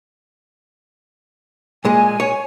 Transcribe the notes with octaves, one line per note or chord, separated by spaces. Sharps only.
A#2 G#3 G#5
C#5